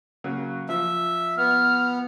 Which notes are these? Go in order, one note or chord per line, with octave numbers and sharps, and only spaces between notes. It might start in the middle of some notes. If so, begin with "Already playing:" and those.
C#3 F#3 A#3
F3 E5
B3 F6